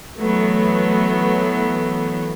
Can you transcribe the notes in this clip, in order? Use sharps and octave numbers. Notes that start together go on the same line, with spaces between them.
E3 F#3 A3 B3